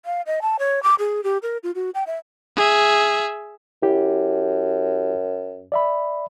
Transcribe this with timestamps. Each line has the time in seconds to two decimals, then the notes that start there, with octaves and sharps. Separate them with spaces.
0.05 F5
0.26 D#5
0.42 A5
0.59 C#5
0.83 D6
0.99 G#4
1.24 G4
1.43 A#4
1.63 F4
1.75 F#4
1.94 G5
2.07 E5
2.56 G#4 E5
3.82 F#2 E4 G4
5.72 D5 E5 B5